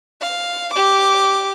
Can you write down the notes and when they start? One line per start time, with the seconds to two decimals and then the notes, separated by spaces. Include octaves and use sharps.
0.21 F5
0.74 G4 D6